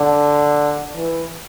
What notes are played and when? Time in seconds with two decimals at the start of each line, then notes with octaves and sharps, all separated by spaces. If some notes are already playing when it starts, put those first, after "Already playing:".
Already playing: D3
0.96 E3